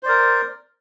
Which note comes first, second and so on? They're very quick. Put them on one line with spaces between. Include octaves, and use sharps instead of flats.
C5 D5 A#4